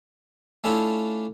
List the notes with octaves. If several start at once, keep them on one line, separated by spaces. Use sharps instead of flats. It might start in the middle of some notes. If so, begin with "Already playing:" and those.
A3 C#4 D4 E4 F4